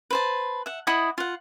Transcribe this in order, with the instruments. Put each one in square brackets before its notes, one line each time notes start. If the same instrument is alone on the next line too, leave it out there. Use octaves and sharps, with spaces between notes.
[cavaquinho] B4 C5 A5
E5 F#5
E4 D#5 F#5 D#6
F4 F#5